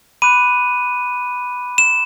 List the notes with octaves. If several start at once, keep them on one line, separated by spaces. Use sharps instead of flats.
B5 D6 F#6 D#7
E7